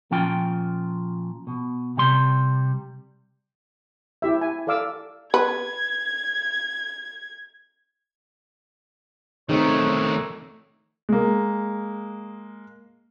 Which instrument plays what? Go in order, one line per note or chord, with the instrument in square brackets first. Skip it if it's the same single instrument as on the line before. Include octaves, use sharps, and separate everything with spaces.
[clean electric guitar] A#2 F3 C#4 F4 G5
B2
C3 G3 C6
[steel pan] E4 G4 E5
G#5
A4 D5 F5 D6 E6
[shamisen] B4 [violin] G#6
[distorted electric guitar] D#3 A3 [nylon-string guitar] C4 D#4 G#4 [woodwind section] C#5
[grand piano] G#3 A#3